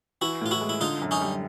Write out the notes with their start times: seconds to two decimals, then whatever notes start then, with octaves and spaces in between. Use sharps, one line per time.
0.21 E3 E4 F#4
0.41 A2 F4
0.51 E4 F#4
0.61 G#3
0.69 E4
0.81 D3 D#4 F4
1.02 F#2
1.11 C#4 D#4
1.21 G3